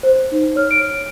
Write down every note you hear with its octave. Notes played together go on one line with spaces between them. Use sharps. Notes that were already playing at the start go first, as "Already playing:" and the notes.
C5
D#4
C#5 F6
D7